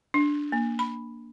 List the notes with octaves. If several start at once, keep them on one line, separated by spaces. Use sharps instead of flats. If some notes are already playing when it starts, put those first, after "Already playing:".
D4
A#3
B5